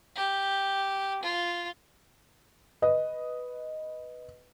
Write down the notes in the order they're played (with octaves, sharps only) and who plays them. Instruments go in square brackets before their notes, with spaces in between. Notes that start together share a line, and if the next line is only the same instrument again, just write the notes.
[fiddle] G4
F4
[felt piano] B4 D#5